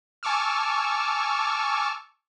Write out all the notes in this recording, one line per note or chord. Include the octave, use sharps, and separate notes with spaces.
G#5 A5 C#6 D6 E6 F6